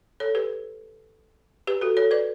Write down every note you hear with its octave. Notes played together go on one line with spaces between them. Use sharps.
A4 C#5
G4 B4
G4 B4
F#4 A4
A4 C#5
B4 D5